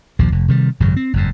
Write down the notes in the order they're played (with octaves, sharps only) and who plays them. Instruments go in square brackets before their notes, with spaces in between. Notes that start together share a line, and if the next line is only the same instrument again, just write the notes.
[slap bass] A#1 D#2 F3
F1
C3 D#3 G3
G#1 F#2 C#3 F#3
C4
F#1 F2 G#2